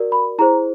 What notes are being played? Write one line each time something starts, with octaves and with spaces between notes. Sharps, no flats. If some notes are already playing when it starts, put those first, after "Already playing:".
Already playing: F#4 A#4 D5
B5
E4 G#4 C5 A#5